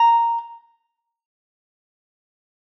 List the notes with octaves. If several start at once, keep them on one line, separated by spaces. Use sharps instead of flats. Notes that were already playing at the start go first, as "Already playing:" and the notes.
Already playing: A#5